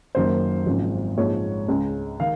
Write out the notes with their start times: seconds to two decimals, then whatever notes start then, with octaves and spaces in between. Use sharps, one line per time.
0.15 F#1 F#2 D#3 F#3 C5
0.66 G#1 F#2 C#3 F3
1.18 A#1 G#2 F3 G#3 C#5
1.69 C#2 C#3 G#3
2.20 D#3 F5